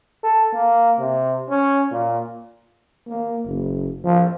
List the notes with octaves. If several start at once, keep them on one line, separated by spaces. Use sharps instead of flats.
A4
A#3
C3
C#4
A#2
A#3
F#1
F3